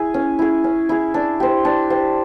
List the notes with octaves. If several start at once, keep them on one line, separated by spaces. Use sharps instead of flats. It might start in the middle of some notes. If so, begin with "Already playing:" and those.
Already playing: E4 G#4
C#4
E4 G#4
C#4
E4 G#4
D4
G4 C5
D4
G4 C5